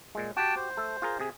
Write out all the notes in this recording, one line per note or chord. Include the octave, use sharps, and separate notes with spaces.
A#2 G#3
F#4 G4 G5 A5
C5
A3 A4
F4 G#4 A#4
C3 G#4